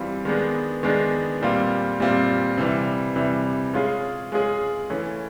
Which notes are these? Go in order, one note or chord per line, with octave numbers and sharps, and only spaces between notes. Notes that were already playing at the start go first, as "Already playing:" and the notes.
Already playing: E3 G3 C4 F4
D#3 G#3 B3 D4
D#3 G#3 B3 D4
A#2 G3 C4 F4
A#2 G3 C4 F4
C3 E3 G3
C3 E3 G3
G#3 C#4 F4 G#4
G#3 C#4 F4 G#4
E3 A3 C#4